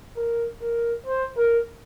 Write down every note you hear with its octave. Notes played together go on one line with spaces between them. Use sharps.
A#4
A#4
C5
A#4